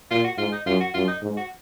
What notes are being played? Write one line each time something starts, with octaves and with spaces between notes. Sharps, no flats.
A#2 F4
F#4
G#2 F4
D#4
F#2 F4
F#4
F#2 F4
D#4
G#2
F#4